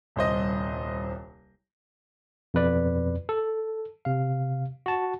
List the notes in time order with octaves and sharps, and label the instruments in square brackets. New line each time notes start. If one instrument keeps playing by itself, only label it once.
[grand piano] D#1 C2 C5 D#5
[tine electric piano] F2 B2 B4 D5
A4
C3 F5
F#4 A5